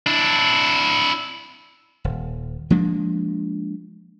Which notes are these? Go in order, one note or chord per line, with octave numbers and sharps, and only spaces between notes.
D4 E4
D#1
F3 G#3 A#3 D4